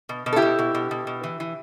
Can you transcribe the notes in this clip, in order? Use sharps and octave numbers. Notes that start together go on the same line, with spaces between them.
B2
B2
A4
E4 G4
B2
B2
B2
B2
B2
E3
E3